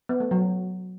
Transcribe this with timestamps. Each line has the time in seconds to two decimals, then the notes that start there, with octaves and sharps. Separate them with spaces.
0.09 B3
0.20 A3
0.31 F#3